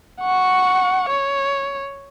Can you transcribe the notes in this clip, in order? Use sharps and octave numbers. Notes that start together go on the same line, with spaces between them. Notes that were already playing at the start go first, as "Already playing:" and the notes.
F#5 C#6
C#5